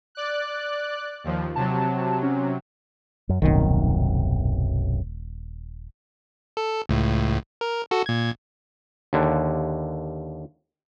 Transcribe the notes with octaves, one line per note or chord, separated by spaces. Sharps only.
D5 F#6
D#2 F3
C3 F#3 A5
C#4
F#2
D#1 B1 F#2 C3 D#3
A4
C#2 A2
A#4
F#4 A4
A#2 G#6
D#2 D3